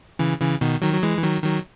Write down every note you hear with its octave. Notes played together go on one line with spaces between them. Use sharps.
C#3 E3
C#3 E3
B2 D#3
D#3 F#3
F#3
E3 G#3
E3
D#3 F#3
D#3 F#3